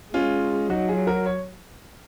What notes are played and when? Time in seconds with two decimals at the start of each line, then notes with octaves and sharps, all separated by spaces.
0.14 G#3 C#4 F4
0.70 F#3 D#4 F#4
0.88 F4 G#4
1.07 F#4 A#4
1.26 C#5